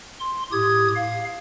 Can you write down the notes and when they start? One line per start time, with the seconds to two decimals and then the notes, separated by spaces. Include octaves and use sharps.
0.19 C6
0.52 A2 G4 D#6 G#6
0.96 F5